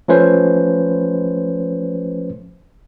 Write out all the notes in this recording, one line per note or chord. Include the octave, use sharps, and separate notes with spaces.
F3 A3 C#4 B4 C5